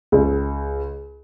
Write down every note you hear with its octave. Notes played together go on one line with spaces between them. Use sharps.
C#2